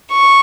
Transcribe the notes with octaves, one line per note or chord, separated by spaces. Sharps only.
C#6